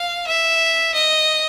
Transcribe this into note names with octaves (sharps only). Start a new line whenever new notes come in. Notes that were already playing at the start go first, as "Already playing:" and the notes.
Already playing: F5
E5
D#5